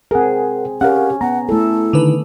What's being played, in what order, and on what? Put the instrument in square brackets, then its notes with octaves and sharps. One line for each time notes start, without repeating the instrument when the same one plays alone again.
[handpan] C4 G#4 [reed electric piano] A#4 F#5
[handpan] C#4 [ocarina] G4 [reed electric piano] A#4 F5 F#5
[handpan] B3 [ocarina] F#5 [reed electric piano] A#5
[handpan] A3 A4 [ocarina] E4
[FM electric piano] D3 D#3 B4